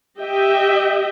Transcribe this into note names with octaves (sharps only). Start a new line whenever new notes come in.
G4 D#5 E5 G5